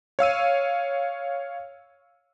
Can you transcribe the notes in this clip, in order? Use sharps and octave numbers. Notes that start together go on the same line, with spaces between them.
C#5 F5 E6 D#7